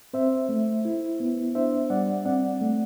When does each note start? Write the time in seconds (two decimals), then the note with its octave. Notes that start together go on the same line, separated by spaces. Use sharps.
0.14 C4 C5 E5
0.49 A3
0.85 E4
1.20 B3
1.55 D4 C5 E5
1.90 G3 D5 F#5
2.25 C4 D5 F#5
2.61 A3